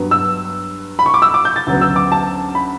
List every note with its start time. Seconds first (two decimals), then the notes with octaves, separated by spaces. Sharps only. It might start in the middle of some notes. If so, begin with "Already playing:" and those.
Already playing: G2 F#3 B3
0.11 E6
0.99 B5
1.06 C#6
1.14 D6
1.22 E6
1.34 D6
1.45 G6
1.56 A6
1.67 D2 C#3 F#3 B3
1.81 E6
1.96 D6
2.12 A5
2.55 B5